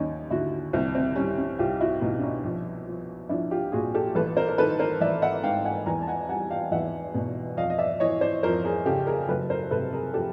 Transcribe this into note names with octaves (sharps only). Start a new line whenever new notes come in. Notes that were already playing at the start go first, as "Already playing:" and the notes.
Already playing: D#2 C#4 D#4
D3 E4 F#4
C2 C4
C4
G3 C#4
C#4
C2 F4 G4
E4 F#4
B2 D#4 F4
D4
C#4 D#4
A#1
F3
A#1 D4 E4
F4 G4
A#2 F#4 G#4
G4 A4
A1 A4 B4
A#4 C5
A#4
D#3 A4 B4
A#4 C5
A1 D5 E5
E5 F#5
G#2 F5 G5
F#5 G#5
E2 G#5 A#5
A5
F#5 G#5
G3 F#5 G#5
F5 G5
E2 E5 F#5
B2
F2 D#5 F5
D#5
D5 E5
E3 C#5 D#5
C5 D5
F2 A#4 C5
G#4 A#4
C#3 G4 A4
G#4 A#4
F#1 A4 B4
A#4 C5
C3 A4 B4
G#4 A#4
F3 G4 A4